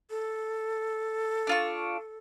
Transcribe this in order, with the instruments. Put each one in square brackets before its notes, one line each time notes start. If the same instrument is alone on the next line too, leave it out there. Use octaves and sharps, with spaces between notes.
[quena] A4
[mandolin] D4 F4 C#6